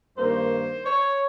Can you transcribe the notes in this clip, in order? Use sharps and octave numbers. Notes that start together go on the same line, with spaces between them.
G2 D#3 A#3 C5
C#5